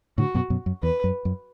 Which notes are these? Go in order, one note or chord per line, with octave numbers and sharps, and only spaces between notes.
A2 D3 F#4
F#2 B2
F#2 B2
F#2
E2 B4
F#2
F#2